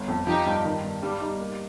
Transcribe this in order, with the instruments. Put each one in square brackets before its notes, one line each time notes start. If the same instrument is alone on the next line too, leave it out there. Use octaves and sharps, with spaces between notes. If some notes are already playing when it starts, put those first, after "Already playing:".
Already playing: [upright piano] G1
F2
[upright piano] F3 [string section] D#4 G4
[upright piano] G2
D#3
G2
[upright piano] G2 [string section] G3
[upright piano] D#4
A#3